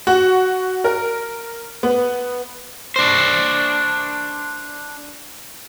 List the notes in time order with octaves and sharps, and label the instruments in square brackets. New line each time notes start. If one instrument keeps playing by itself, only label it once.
[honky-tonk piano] F#4
A#4
B3
[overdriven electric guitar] D4 C5